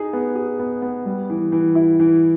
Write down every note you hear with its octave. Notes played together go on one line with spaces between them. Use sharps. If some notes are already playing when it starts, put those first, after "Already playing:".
Already playing: D#4 G#4
B3
G#4
B3
B3
G3
E3
E3
E4
E3